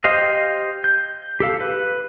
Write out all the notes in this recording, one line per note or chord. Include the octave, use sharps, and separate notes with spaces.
G4 C5 D#5 F5
G6
G4 A4 F5
B4